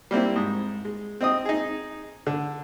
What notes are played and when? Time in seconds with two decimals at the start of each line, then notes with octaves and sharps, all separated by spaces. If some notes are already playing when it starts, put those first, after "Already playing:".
0.11 G3 A#3 C4 E4
0.36 G#2
0.85 G#3
1.21 C4 D#5 D#6
1.45 D#4 G#4
2.27 D3